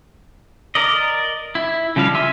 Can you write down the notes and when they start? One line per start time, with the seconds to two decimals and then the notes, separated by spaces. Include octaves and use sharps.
0.75 A#4 D5 D#5
1.55 E4
1.96 C#3 F3 G3 G#3 F5
2.15 E5 G#5 C6 E6